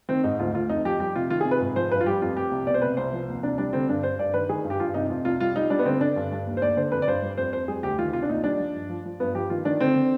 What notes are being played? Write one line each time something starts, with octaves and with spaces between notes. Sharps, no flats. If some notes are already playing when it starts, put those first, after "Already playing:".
D#3 C4
G#2 D#4
D2 F4
D2 F4
F2 D#4
F3 G4
G3 G4
C3 F4
D#3 F4
G#4
C3
B4
G#2
F3 C5
G2 B4
F4
G3 G4
F2 F4
F2 G4
C2
B2 D5
C5
C3 B4
C2 C5
F3
D#2
C2 D4
G3 D4
D3 C4
G2 D4
G2 C5
G2 D5
D#3 B4
D#3 G#4
G2
G4
G2 F4
C3 D#4
F2 F4
C2 F4
G3 F4
G3 D#4
G3 D4
B3
D3 C4
D3 D4
G2
G2
D#2
C5
D#2 D5
D3 C5
F2 B4
D5
G2 C5
G3
F2 C5
F2 C5
G3 G#4
D2 G4
D#3 F4
C2 F4
D4
D#2 D#4
G3 D4
F3
G2
F3
F3
G2 B3
F3 G4
D#3 F4
D#3 D4
D3 C4
D3